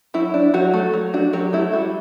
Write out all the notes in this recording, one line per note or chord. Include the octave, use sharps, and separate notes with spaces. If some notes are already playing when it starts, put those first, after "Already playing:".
F#3 E4
D4
F#3 F#4
A3
F#3
D4 F#4
F#3 G4
A3 E4
G3 F#4